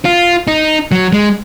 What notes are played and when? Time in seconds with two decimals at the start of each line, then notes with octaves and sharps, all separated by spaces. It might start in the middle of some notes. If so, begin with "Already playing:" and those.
0.05 F4
0.48 D#4
0.92 F#3
1.12 G#3